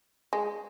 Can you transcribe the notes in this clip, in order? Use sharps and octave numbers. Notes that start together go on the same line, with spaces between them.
G#3